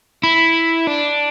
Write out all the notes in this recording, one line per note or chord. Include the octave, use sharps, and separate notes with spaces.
E4
D4